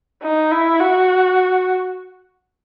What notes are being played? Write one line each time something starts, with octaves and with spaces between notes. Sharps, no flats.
D#4
E4
F#4